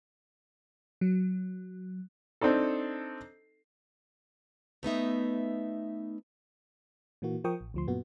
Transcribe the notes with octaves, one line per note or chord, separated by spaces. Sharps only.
F#3
C4 D4 D#4 A4
A3 B3 D#4 E5
A#2 E3 A#3 F#4
F3 A#4 G5 C#6 D#6
A1
D2 F3 C6
F#2 A#2 B3 F#4